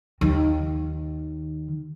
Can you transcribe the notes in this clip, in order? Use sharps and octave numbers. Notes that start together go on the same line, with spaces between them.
D#2 D#3